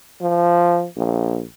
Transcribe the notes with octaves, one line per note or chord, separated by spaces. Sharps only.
F3
A#1